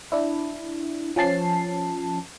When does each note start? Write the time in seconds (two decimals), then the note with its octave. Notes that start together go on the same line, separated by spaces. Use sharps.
0.12 D4 E4
1.16 F3 C#4 A5 C7